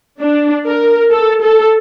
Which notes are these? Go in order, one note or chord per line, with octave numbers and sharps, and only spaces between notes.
D4
A#4
A4
A4